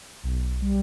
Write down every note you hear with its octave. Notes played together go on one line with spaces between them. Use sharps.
B1
G3